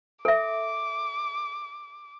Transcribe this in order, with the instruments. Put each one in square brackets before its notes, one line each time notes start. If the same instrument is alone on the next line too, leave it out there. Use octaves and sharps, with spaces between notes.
[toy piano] A4 E5 [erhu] D6